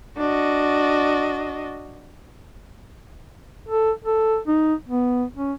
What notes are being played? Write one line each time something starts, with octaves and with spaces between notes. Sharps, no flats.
D4 F#4 D#5
A4
A4
D#4
B3
C#4